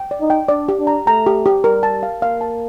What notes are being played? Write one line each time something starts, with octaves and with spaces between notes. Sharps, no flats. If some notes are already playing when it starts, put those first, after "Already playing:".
Already playing: G5
D5
D#4
G5
D4 D5
G4
D4
A#5
A3 A#5
G4
G4
G3 A#4
A5
F5
A#3 F5
A5